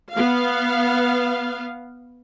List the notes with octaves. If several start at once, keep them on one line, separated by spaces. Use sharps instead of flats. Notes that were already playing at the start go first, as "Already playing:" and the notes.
B3 F5